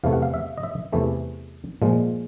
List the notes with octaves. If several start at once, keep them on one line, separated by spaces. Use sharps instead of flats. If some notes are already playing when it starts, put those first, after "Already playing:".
E2 C3 E3 A3 F5
F#5
F5
E5
D#5
E5
E2 C3 E3 A3
A#2 F3 G#3